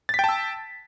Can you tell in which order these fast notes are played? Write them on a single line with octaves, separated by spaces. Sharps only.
A6 B6 G5 A5 E6